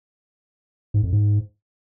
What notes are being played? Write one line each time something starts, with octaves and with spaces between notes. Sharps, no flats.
G#2
F2
G#2